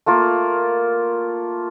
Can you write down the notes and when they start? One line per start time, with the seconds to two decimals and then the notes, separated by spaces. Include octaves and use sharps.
0.06 A3 A#3 F4 A#4